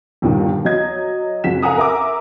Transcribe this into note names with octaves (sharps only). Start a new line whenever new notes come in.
G1 D#2 A#2 D3 D#3
F#3 D#5 G#6
F#1 F2 F#4 B6 E7
A4 F5 F#5 G#5 A#5 D#6
A#4 E5 A#5 D6 E6